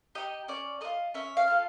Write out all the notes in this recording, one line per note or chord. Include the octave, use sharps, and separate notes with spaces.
D#4 G4 D#5
C#4 D5
F4 A4 D#5
C#4 E5
F5
F4 A4